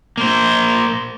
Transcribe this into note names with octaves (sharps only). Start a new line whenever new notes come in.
A#3 C5